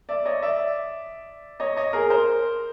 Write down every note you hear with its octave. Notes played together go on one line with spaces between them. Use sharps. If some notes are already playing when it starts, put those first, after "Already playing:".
D5 E5
C#5 D#5
D5 E5
C#5 D#5
C#5 D#5
G#4 A#4
A#4 C5